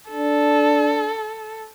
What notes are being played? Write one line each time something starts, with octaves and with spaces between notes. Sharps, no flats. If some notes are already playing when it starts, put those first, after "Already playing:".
D4 A4